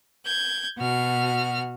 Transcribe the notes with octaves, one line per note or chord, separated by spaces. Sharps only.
G6 G#6
B2 F#4 F6